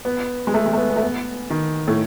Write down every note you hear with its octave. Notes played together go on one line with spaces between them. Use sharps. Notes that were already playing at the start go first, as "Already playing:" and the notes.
B3
G#3
A3
G#3
A3
B3
B3
A3
B3
D#3
A2